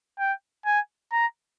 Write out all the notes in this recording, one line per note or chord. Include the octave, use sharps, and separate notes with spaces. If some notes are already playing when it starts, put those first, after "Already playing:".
G5
G#5
A#5